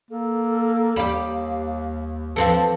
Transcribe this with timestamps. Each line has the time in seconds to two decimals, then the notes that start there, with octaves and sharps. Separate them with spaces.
0.11 A#3 A4
0.96 D#2 G3 G4 F5
2.36 E3 F3 C4 A4 A5